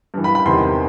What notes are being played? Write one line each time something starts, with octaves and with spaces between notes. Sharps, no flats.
G2 E3
B5
B5
E2 C3 D#3 C6